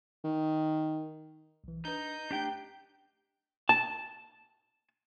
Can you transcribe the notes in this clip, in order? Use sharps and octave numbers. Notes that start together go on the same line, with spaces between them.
D#3
B1 E3
D4 D#4 B4 G6
A3 D4 G4 G5 B6
A5